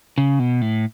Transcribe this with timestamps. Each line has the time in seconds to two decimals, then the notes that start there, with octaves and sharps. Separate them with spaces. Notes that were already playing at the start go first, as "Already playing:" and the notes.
0.18 C#3
0.39 B2
0.61 A2